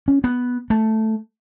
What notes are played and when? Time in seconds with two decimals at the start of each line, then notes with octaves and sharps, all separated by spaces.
0.08 C#4
0.24 B3
0.70 A3